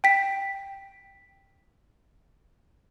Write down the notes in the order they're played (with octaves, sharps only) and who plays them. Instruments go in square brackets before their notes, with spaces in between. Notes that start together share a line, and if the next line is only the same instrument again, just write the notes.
[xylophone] G5 B6